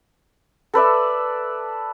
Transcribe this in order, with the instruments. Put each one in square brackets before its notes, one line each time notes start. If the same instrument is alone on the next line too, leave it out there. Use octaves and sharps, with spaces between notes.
[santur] A4 B4 D5 E5